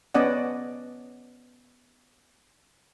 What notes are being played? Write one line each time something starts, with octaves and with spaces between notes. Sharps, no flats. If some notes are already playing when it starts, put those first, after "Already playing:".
B3 C#4 D5 D#5 F#5